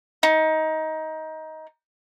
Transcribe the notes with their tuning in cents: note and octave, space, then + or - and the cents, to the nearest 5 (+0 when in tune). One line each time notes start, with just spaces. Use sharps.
D#4 +20